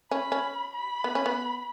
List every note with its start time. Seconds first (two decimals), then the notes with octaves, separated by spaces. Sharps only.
0.11 C#4 B5
0.32 C#4
0.73 B5
1.04 B3
1.15 C#4
1.26 B3